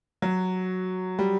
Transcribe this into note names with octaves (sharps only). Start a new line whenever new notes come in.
F#3
G3